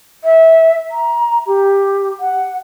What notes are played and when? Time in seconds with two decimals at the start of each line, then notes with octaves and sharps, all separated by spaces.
0.24 E5
0.91 A#5
1.47 G4
2.20 F#5